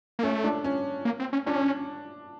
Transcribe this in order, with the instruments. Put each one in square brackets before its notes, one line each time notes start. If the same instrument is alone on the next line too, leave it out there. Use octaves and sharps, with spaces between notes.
[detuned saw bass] A#3
[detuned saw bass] A3 [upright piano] C#4
[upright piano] D4
C#4
[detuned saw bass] A#3
C4
C#4
[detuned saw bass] C#4 [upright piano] D4